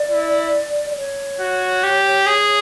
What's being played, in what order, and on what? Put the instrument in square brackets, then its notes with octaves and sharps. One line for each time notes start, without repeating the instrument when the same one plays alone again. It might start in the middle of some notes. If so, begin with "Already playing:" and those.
Already playing: [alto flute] D5
[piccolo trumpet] E4
[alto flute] D5
C#5
[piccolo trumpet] F#4
G4
G#4